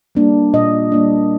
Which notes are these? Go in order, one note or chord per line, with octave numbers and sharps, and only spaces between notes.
G3 A#3 D4
A#2 D#5
G3 A#3 D4